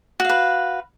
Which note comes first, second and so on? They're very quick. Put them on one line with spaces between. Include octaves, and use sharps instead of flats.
F#4 F5 B4